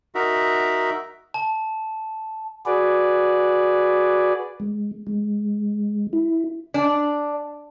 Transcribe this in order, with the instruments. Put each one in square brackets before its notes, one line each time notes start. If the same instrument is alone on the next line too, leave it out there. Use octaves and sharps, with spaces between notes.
[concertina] D#4 F#4 A#4 E5
[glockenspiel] A5
[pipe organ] F#4 G#4 B4 D5
[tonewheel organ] G#3
G#3
E4
[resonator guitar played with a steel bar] D4